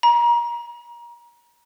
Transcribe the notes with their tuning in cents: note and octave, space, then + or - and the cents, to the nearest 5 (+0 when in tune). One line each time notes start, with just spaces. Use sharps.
A#5 +30